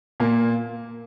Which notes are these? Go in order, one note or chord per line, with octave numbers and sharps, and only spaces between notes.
A#2 A#3